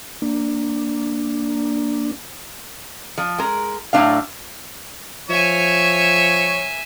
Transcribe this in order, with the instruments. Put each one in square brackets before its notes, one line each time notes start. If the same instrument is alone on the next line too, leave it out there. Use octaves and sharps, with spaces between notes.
[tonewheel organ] A#3 D4
[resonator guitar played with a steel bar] F3
G#3 A#4
A2 F#3 A3 D4 F5
[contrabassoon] F3 [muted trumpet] C#5 [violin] E5 G#5